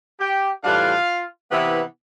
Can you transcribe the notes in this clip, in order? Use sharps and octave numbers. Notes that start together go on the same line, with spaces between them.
G4 G5
A2 E3 G3 D4 F4 F5
C3 E3 B3 E4